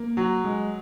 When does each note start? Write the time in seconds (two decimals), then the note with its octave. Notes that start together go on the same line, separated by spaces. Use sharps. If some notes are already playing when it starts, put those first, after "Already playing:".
Already playing: A#3
0.17 F#3
0.44 G#3